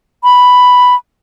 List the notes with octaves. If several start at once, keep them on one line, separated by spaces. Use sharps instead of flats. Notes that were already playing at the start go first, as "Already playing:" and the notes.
B5